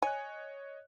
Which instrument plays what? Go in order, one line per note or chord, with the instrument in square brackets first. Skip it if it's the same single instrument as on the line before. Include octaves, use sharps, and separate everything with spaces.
[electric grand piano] C#5 D#5 F#6 [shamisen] G#5